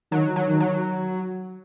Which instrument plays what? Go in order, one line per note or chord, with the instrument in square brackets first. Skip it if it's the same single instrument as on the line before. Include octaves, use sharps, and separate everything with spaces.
[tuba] D#3 [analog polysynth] F#3
[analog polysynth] F#3
[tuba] D#3
[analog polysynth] F#3